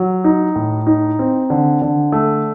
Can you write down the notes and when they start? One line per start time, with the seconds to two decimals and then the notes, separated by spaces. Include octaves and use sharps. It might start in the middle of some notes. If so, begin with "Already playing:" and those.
Already playing: F#3
0.24 D#4
0.56 A2
0.87 D#4
1.19 C4
1.50 D3
1.82 D3
2.12 A3